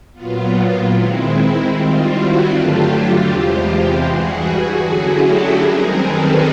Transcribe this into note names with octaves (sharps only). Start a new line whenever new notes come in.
A#2 F#3 B3 F4
D#3 G#3 C4 E4
D#3 G3 C4 F4
E4 F#4
G2 D3 F#3 A3 D4 F4 G4
F4 G4
E2 C3 E3 G#3 C4
F4 G4
G2 E3 G3 F#4 G#4
D3 F#3 A3 C#4 E4
G4 A4
F#2 D#3 G3 C4 G#4 A#4
A4 B4